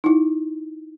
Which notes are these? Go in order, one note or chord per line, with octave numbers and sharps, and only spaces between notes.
D#4 E4